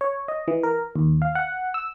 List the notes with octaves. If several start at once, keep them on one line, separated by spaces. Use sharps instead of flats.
C#5
D#5
E3
A#4
D#2
F5
F#5
E6